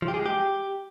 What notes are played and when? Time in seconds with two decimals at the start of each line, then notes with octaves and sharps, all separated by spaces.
0.02 F3
0.08 G4
0.14 G#4
0.20 G#3
0.26 G4